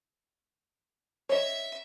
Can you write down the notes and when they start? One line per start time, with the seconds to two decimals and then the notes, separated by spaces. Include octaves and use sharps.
1.29 C#5 D#5 E5